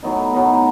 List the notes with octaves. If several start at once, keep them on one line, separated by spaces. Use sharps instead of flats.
A2 F#3 B3 D#4
A2 F#3 B3 D#4